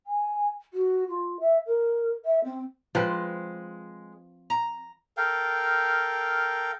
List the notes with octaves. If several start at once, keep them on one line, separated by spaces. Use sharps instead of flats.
G#5
F#4
F4
E5
A#4
E5
C4
F3 G#3 C4 B4
A#5
A4 A#4 F5 G5